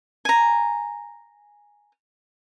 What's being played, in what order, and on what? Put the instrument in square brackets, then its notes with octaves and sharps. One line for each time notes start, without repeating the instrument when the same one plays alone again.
[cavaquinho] G#5 A#5